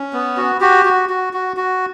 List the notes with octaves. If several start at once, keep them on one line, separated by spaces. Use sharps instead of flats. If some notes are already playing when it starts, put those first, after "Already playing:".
Already playing: C#4
B3
F#4
F#4 G4
F#4
F#4
F#4
F#4